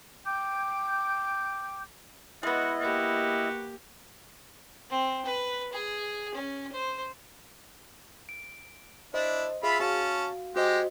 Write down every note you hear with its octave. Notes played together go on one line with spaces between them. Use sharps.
G5 D6 G6
G#3 B3 E4 F#4 D#5
A#3 F#4 G4
C4
B4
G#4
C#4
C5
D7
D4 E4 C5 D#5
F4 G#4 E5 B5
C#4 F#4 F5 A5
G#3 F#4 G4 C5 D#5